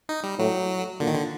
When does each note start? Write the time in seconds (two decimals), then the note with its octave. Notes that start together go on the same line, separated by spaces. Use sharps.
0.09 D#4
0.23 G3
0.39 A2 F#3
1.00 A#2 D3
1.07 D#3
1.15 D3